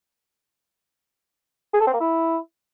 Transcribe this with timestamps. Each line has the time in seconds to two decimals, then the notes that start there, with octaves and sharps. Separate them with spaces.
1.74 G#4
1.80 A4
1.87 C4
1.94 A#3
2.00 E4